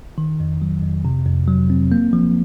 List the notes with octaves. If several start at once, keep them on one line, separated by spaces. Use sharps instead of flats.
D#3
F2
F#3
F2
C3
F2
F#3
C4
A#3
F3